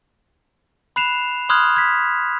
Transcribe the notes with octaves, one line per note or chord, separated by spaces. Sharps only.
B5 F#6 C7 E7 F7
B5 C6 D#6 F6 F#6 G#6
G#6 B6